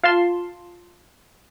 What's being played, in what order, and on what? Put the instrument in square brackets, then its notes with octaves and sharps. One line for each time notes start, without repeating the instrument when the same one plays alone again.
[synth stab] F4 F5 A5 C6